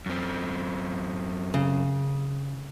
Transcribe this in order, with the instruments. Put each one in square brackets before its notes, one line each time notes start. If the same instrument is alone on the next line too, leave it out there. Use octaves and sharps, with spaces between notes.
[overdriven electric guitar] F#2 C4
[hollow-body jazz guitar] C#3